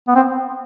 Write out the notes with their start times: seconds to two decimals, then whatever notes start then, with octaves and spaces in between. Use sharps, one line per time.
0.08 B3
0.16 C4